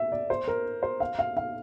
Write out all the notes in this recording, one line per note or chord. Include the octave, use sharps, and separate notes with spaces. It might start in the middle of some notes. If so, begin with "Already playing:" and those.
Already playing: E5
D5
C5
A#4
C5
F5
F5
F5